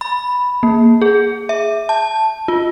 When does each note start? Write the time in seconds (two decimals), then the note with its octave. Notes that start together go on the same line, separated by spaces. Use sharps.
0.01 B5
0.63 A#3
1.02 G#4
1.49 E5
1.89 A5
2.48 F4